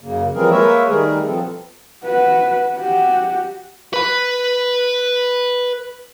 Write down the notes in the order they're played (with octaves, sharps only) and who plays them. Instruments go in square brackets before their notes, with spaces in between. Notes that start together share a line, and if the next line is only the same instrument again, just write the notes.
[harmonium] F#2 C#3 A#3
E3 F3 G3 C4 G#4 A#4
G#3 A#3 A#4 B4 C#5 E5
D#3 G3 A3 G#4 A#4
B2 F3 F#3 B3 C4 A4
[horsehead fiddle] F#4 B4
F#4 G4
[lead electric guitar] B4 B5